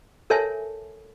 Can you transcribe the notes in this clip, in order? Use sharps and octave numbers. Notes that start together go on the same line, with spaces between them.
A4 A#4 C#5 E5 G#5 A5